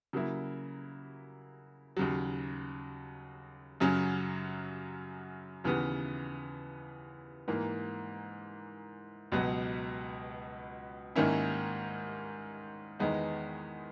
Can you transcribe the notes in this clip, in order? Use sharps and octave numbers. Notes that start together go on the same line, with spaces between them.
C#3 F#3 A#3 E4
D#2 C#3 F#3
F#2 C#3 F#3 C#4
D#2 C#3 E3 B3
G#2 E3 A#3
C#2 B2 F#3 B3
G#2 D#3 A#3 C#4 E4
E2 D#3 G#3 B3 D#4